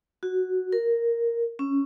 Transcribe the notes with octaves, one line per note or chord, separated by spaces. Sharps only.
F#4
A#4
C#4